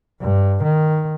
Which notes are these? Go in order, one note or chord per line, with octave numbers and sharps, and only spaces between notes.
G2
D#3